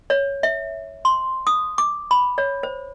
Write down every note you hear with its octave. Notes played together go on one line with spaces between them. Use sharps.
C#5
E5
C6
D#6
D6
B5
C#5
C5